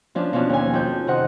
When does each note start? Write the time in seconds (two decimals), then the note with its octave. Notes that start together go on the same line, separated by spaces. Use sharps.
0.15 F3 C#4 D4
0.33 B2 F3 C#4 D4
0.49 D#2 G#5
0.74 F2 G6
1.07 C3 D#3 C5 D#5 F#5